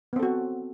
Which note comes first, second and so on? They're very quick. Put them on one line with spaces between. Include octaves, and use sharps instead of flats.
B3 C4 A4 F#4